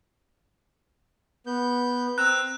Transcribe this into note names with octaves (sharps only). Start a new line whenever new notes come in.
B3 G6
C4 A#5 E6 F#6